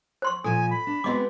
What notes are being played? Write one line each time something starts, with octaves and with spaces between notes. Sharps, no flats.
C5 C6 C#6
A#2 F3 A4 G#5
B5
D4
G#3 B3 C4 F#4 D#5 D6